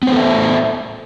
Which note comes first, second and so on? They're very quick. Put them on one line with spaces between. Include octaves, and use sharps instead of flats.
B3 C5 A4 E5